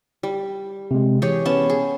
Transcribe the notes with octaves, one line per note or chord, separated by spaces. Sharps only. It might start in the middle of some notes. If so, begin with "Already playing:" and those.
G3
C3 G#3
E3 G4 G#4 C#5
B3 C#4 A5
G#4